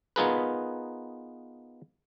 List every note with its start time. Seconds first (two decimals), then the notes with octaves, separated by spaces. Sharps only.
0.16 B3 D#4 F4 G#4 A#4 B4